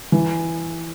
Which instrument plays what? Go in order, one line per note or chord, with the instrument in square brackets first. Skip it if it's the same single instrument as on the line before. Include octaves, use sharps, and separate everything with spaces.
[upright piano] E3